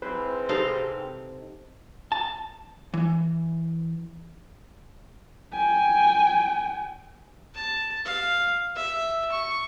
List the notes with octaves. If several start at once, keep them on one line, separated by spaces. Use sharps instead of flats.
G#2 C4 E4 B4 C5
C3 D#4 A4 F5
A5
E3
G5 G#5
A5
F5
E5
C#6